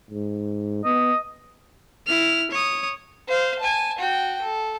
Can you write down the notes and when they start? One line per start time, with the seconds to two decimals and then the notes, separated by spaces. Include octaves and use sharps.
0.10 G#2
0.85 B3 D#5
2.06 E4 F6
2.51 C#5 D#6
3.28 C5 F5
3.59 G#5 A5
3.99 F#4 G5
4.42 A4